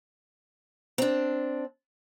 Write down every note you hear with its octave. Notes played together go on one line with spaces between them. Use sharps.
C4 D4